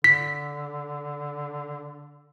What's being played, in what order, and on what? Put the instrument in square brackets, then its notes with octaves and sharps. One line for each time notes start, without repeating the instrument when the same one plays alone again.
[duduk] D3 [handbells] B6